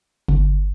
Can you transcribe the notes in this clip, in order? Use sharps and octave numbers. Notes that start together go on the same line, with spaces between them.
G1